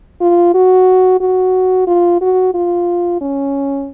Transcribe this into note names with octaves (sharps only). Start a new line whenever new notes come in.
F4
F#4
F#4
F4
F#4
F4
C#4